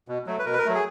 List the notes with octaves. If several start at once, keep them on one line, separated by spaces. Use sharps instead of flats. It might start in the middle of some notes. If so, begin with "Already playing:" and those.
B2
F#3 A3
B4
B2 A#4
B4
A#4
F#3 A3
G#4